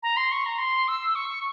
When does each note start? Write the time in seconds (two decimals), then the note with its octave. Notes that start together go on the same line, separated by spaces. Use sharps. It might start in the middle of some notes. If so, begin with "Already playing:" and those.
0.03 A#5
0.16 C6
0.31 C#6
0.45 A#5
0.58 C6
0.87 E6
1.15 C#6